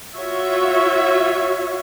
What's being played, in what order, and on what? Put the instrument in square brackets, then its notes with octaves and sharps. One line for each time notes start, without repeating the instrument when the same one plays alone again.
[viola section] F4 F#4 C#5 E5